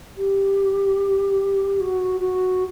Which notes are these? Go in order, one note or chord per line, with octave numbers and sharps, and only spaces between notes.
G4
F#4
F#4